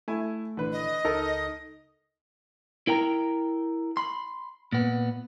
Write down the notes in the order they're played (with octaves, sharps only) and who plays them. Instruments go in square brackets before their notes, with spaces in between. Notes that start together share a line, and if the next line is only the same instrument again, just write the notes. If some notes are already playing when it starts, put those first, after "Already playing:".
[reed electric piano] A3 [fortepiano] E4 G#5
[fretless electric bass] A#1 E3 [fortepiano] D3 B4
[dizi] D#5
[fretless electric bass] C#2 [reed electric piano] D#4 A4 D#6 [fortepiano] A#4
[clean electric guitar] E4 A#4 G5 A#5
B5 C6
A#2 B3